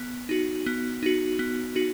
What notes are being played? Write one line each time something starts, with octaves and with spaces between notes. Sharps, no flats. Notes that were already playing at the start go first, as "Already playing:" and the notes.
Already playing: B3
D#4 F#4
B3
D#4 F#4
B3
D#4 F#4